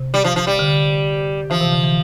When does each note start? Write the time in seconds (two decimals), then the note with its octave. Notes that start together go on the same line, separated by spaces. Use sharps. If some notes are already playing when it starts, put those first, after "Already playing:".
Already playing: C3
0.14 G3
0.24 F3
0.36 F3
0.47 G3
0.59 D3
1.50 E3 F3
1.61 C3
1.72 D3
1.84 E3